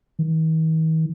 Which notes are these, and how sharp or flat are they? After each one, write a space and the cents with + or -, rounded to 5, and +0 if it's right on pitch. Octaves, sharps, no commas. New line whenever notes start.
D#3 +45